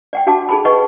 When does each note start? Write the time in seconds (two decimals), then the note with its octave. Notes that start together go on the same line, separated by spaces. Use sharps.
0.13 D5 F#5 G5
0.27 D4 F#4 F5 A5 D6
0.49 D#4 G#4 A4 A5 B5
0.65 D#4 A4 B4 D#5 F#5 C#6